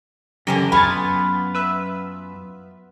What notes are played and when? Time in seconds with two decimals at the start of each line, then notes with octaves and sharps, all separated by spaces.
0.47 F#2 D3 E3 C#4 G4 A#4
0.72 B3 F4 G#5 B5 C#6 A6
1.55 B4 E5